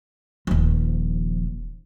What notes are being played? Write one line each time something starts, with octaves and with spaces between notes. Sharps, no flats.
D#1 F3